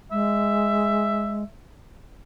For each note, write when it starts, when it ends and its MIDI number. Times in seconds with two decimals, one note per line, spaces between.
0.12 1.43 56
0.12 1.49 76